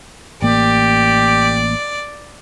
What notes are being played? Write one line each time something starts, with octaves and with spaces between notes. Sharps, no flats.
A1 A#3 G4 D5